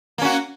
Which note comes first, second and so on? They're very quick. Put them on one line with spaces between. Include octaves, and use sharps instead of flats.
A#3 C#4 F#4